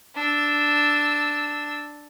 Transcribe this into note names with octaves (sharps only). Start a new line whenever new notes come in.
D4 E6